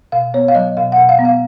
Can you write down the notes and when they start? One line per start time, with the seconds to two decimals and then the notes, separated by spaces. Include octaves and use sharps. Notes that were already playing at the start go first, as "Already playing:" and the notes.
0.12 B2 F5
0.34 B3 C#5
0.48 F5
0.55 F#3 D#5
0.77 B2 F5
0.92 F#5
0.98 B2
1.09 F5
1.19 B3
1.25 F5